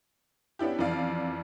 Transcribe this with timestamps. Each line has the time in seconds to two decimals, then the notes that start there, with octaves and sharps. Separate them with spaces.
0.59 B3 C#4 D4 E4 G4
0.79 F2 E3 D5 F5